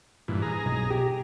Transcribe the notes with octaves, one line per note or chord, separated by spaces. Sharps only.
G2 A#2 E3
G#4 A#5
B1
G4